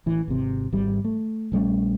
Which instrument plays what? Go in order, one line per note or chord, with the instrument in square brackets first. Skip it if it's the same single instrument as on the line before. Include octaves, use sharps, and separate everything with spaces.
[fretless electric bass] A1 E3
G#1 C3
G#1 G3
A3
A#1 G3 A3 C#4